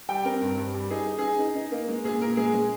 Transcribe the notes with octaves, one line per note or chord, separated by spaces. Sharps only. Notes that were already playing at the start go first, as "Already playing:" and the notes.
G3 G5
C4 A#4
G2
G2
G3
D#4 G#4
D#4
D#4 G#4
D#4
D#4
A#3
G#3
A#2 G#4
A#2 A#4
G#3 G#4
G#3